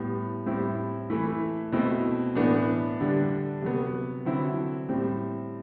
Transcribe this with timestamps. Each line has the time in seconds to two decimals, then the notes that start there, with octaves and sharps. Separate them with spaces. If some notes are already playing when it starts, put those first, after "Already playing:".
Already playing: A2 G3 B3
0.46 A2 G3 C4 E4
1.10 E3 A3 E4
1.72 B2 A3 C4 E4
2.35 A2 E3 B3 D4
3.00 D3 G3 D4
3.62 C3 F#3 B3
4.25 D3 F#3 C4 E4
4.89 A2 G3 C4